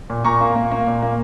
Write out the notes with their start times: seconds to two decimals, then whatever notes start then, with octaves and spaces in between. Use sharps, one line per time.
0.10 A#2
0.25 A#2 A#5 C#6
0.41 A#3
0.56 A#3
0.71 A#3
0.87 A#2
1.02 A#3